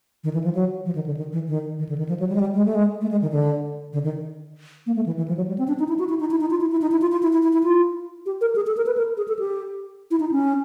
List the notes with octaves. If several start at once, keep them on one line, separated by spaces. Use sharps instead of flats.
D#3
E3
F3
F#3
F3
D#3
D3
D#3
E3
D#3
D#3
D3
D#3
F3
F#3
G3
G#3
G3
G#3
A3
G#3
A3
G#3
D#3
D3
D3
D#3
A#3
A3
E3
E3
F3
F#3
G3
C4
D4
D#4
E4
F#4
E4
D#4
E4
D#4
F4
E4
E4
D#4
E4
F4
F4
E4
E4
E4
E4
F4
G4
A#4
G#4
A4
A#4
B4
A#4
G#4
A4
G4
E4
D#4
C#4